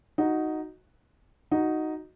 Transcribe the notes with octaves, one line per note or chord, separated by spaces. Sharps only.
D#4 F#4
D#4 F#4